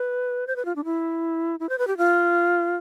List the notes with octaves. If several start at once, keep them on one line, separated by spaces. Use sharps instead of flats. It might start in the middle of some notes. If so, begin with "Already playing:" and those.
Already playing: B4
C5
B4
F4
D4
E4
E4
C5
B4
G4
F4